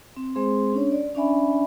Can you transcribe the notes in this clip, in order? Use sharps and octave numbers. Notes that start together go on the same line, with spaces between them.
C4
G#3 C4 G#4 C5 C6
C#4 D4 C#5
D5
C#4 D4 D5 E5 G#5 B5